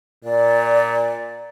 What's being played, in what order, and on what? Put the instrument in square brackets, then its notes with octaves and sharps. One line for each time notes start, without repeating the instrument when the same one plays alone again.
[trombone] A#2 [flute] D5